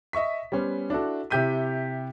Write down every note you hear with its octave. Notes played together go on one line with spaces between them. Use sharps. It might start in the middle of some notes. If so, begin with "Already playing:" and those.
D#5 E5 C#6 B6
G3 B3 C#4 C5
D4 E4 F#4 A4
C3 E4 G4 G6 B6 D#7